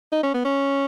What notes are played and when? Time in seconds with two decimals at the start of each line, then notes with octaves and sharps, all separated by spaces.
0.12 D#4
0.23 C#4
0.34 B3
0.45 C#4